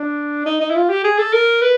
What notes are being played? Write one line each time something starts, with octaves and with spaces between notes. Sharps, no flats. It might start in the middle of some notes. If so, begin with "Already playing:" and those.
Already playing: D4
D#4
D#4
E4
F4
G4
G#4
A4
A#4
B4